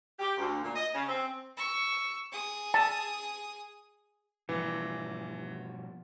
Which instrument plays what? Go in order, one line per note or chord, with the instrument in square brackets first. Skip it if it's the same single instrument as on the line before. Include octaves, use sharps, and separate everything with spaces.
[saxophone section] G4
D2
A#2
D#5
C#3
C4
[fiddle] C#6 E6
G#4 D#6
[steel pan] A5
[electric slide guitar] B2 F3 G3 [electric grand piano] E3